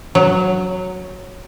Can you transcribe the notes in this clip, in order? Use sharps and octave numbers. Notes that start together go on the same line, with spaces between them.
F#3